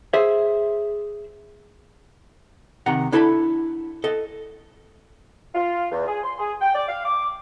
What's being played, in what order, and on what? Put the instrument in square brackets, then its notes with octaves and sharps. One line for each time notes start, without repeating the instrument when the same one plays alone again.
[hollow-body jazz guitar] G#4 C5 E5
C3 D#3 F#5 A#5
D4 E4 A4 A5 B5
A4 D#5
[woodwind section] F4
E2
G#4
C6
G#4
G5
D5
F5
D6